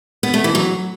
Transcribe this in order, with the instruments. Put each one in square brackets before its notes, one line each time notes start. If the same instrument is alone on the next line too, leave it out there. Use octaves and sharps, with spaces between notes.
[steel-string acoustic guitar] B3
A3
E3
F#3